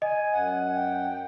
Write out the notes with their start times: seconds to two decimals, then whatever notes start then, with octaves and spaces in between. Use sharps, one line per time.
0.02 D#5 G#5
0.33 F#2 F#5
0.75 G5